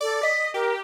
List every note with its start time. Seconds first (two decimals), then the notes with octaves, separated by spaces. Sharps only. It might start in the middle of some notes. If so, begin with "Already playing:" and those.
0.01 A4 D5
0.23 D#5 B6
0.54 G4 A#4